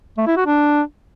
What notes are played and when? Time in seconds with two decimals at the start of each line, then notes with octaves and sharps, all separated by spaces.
0.18 A3
0.27 E4
0.37 F#4
0.46 D4